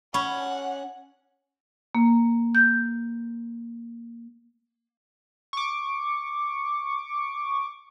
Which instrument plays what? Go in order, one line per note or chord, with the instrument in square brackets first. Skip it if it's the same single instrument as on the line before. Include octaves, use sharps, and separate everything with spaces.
[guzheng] C#4 [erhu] F#5 [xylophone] B5 C#6
[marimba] A#3
G6
[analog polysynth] C#6 D6